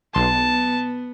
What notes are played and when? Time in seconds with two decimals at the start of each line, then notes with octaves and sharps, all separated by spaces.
0.15 B1 B3 A5 C6